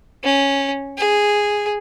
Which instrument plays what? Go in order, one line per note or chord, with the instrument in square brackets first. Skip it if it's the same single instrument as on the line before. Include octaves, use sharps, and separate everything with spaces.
[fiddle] C#4
G#4